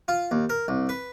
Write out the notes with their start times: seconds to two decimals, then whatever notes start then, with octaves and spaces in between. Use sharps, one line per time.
0.08 F4
0.31 D#2
0.50 A#4
0.68 C2
0.89 B4